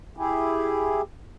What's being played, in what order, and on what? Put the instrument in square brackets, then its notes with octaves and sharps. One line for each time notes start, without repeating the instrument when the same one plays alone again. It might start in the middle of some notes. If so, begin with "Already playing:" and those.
[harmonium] E4 G4 G#4